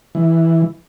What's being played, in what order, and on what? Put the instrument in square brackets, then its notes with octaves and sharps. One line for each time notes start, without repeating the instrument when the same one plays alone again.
[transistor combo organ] E3